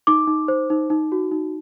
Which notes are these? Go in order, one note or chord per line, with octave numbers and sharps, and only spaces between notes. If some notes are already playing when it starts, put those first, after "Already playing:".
D#4 D6
D#4
C5
D#4
D#4
F#4
D#4